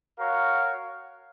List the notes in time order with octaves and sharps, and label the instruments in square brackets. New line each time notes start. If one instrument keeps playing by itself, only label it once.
[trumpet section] F#4 A#4 C#5 F5